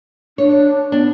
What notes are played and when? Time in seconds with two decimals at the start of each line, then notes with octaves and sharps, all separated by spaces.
0.38 D4 C#5
0.92 B3 D4